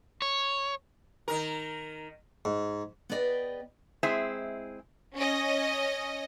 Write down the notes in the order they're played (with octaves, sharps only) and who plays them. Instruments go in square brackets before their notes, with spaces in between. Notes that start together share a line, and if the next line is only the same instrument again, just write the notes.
[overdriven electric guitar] C#5
[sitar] D#3 A#4
[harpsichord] G#2
[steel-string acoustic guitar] B3 G#4 B4 D5 D#5 G5
[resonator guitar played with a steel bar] G#3 C4 E4 G#4 E5
[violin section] C#4 D#5